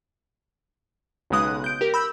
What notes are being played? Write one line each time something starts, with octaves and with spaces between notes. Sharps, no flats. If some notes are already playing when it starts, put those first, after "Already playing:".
B1 C#3 G#3 D#6 F#6
G6 D7
G4 A#4
B5 E6 G6